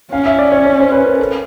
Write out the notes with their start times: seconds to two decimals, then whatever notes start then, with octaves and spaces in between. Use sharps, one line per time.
0.11 C#4 F5
0.26 E5
0.39 D5
0.52 C#5
0.65 C#5
0.80 C5
0.92 B4
1.06 A#4
1.19 A4